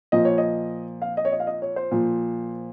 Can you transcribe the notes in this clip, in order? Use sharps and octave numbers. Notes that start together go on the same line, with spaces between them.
A#2 F3 D#5
C#5
D#5
F5
D#5
C#5
D#5
F5
D#5
C#5
C5
A#2 F3